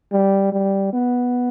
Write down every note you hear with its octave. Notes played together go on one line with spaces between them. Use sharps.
G3
G3
B3